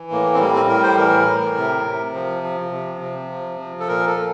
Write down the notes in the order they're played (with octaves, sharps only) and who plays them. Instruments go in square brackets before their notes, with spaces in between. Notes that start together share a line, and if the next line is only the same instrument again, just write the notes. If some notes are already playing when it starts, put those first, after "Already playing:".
Already playing: [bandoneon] E3
A2 A#3
C4
G3 A#3
C4
A2 A#4
C5
E3 A#4
A2
C3
C3
F3
F3
C3
C3
F3
F3
A4
A#2 A#4
A4
A#2